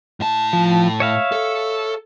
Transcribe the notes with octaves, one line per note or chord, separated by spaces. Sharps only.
A2 A5
F3
C#5 E5 F5
A4